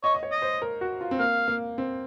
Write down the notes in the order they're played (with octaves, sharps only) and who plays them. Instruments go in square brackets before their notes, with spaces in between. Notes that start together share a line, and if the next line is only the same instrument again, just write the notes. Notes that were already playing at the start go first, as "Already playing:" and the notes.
[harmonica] C#5 [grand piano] D#5
[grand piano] D#5
C#5
[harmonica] D#5
[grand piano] C5
A#4
F#4
F4
C4
[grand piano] A#3 [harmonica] F5
[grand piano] A#3
C4